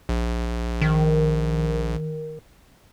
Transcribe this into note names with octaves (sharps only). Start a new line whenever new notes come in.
A#1
D#3